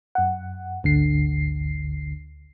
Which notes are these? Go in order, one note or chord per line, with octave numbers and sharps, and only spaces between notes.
F#2 F#5
G#1 D2 D3 C7